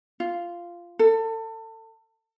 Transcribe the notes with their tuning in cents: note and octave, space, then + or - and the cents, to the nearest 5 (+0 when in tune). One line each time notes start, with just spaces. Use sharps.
F4 -10
A4 +30